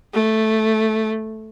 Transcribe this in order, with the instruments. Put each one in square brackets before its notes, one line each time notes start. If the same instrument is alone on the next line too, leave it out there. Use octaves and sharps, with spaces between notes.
[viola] A3